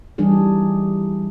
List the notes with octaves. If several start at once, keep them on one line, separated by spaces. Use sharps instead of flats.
E3 G3 D4 D#4 G#4